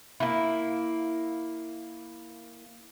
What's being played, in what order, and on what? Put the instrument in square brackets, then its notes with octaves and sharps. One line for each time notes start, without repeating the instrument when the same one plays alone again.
[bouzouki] A#3 E4